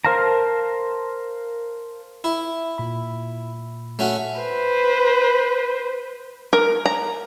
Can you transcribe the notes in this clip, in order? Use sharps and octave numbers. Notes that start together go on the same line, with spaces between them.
A#4 C5 F5 A5 A#5
E4
A#2 B5
A3 C#4 F#4
B4 C5
A#4
A#5